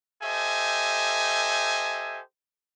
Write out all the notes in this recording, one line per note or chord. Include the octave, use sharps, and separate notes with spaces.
G4 A4 C5 D#5 E5 G#5